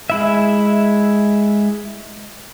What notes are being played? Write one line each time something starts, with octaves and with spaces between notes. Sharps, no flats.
G#3 E4 E5